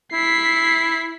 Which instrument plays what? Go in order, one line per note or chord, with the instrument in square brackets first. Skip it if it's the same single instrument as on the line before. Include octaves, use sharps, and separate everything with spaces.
[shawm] E4 [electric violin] B6 C7